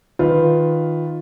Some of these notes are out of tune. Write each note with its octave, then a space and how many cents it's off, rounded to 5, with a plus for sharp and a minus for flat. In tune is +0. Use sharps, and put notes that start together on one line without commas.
D#3 +0 F4 +0 B4 +0